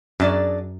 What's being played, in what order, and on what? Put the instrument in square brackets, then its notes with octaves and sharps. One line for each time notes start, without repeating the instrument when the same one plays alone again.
[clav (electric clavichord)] F#2 [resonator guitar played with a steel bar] F#3 D4 G#4 D5